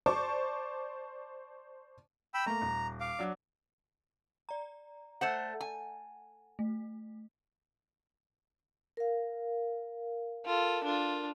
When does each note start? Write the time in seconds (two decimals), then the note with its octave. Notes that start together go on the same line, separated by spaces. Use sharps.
0.06 C5 D5 A5 C#6 D6
2.34 G5 B5 E6
2.46 A3 A#3 A#5
2.62 D#1
3.00 F5 D6
3.19 F#3 D4
4.49 D5 A#5
5.21 A3 C5 F#5
5.61 G#5
6.59 A3
8.97 A#4 F5
10.45 F4 A4
10.84 D4 F4